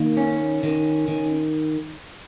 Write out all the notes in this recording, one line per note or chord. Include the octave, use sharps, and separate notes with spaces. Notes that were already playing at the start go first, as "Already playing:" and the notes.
Already playing: D#3 A#3
C#4
D#3
D#3